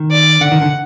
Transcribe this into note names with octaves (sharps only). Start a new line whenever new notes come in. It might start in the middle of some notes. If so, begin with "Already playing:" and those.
Already playing: D#3
D5
D3 F#5
D#3
D3